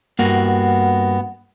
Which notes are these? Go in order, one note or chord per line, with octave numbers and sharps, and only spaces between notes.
G2 A#3 B3 F#4